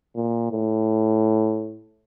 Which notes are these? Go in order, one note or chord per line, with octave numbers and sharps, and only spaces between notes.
A#2
A2